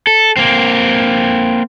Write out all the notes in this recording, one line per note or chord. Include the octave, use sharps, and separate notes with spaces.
A4
A#3 C4